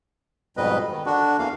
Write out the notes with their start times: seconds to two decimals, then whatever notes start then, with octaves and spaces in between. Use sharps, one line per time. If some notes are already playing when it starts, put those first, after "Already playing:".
0.57 F2 G#2 B2 G3 B4 D#5
0.91 D#3
1.06 D3 D4 F#4
1.39 E2 E3 A#3 F5